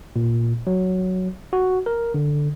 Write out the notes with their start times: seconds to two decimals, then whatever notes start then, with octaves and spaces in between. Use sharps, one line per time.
0.16 A#2
0.67 F#3
1.53 F#4
1.86 A#4
2.14 D3